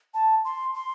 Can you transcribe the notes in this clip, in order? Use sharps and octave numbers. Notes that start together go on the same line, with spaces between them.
A5
C6
C6